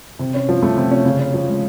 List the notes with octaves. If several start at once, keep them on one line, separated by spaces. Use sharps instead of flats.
C3
C#4
F3
A3
C3
C#4
C#3
C#4
F3
G#3